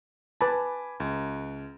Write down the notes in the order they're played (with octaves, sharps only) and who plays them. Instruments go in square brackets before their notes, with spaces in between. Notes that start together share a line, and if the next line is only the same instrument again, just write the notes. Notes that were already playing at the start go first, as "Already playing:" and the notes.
[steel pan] B4 A5 [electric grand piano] G#5 B5 D6
[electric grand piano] C#2